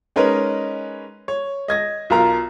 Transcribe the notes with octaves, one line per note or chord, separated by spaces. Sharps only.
G#3 C#4 D#4 A#4 B4 C#5
C#5
D#5 G#6 A#6
B1 F4 A#4 A#5